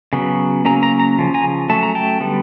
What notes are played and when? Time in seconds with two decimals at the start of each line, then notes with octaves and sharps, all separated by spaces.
0.13 C#3 F#3 B3
0.65 C#3 F#3 A#3 C#4 A#5
0.83 A#5
1.00 A#5
1.19 C#3 F3
1.34 G#5 A#5
1.69 F#3 A3 C#4 A5
1.83 A#5
1.95 G5 A5
2.20 D3 G3 B3